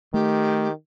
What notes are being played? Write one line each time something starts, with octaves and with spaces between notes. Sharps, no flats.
D#3 A3 G4